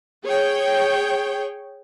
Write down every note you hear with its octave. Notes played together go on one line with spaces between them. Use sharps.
G#4 C#5 G5